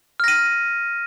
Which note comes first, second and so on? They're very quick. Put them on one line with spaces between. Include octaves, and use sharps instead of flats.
F6 A#6 D#7